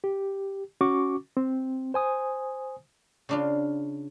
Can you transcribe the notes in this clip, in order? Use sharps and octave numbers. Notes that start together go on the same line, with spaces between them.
G4
C#4 F#4 C#6 D6
C4
C5 G#5 D#6
C#3 D4 F4